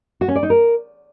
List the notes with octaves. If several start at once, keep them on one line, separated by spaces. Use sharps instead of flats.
F#4
C#4
D5
D#4
A#4